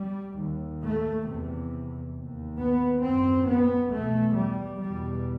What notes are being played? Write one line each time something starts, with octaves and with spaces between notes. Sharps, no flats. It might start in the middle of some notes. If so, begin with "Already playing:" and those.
Already playing: G3
D#2
A3
E2 C3
D#2
B3
F#2 C4
B3
E2 B2 A3
G3
E2 B2 G3